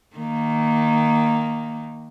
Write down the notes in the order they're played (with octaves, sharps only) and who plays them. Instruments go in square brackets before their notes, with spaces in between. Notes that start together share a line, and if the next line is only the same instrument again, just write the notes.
[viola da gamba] D#3 A#3